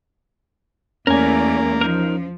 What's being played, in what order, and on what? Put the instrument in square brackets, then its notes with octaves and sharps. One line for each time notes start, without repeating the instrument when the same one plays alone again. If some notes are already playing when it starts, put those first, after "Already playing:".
[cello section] E2 A3 D5 [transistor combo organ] A#3 [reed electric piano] C#4 [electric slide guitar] A#4 G#5
[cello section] F3 [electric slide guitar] D#4 A#4